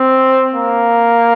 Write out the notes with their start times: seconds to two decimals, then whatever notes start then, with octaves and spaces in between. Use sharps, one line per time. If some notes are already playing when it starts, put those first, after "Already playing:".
Already playing: C4
0.55 A#3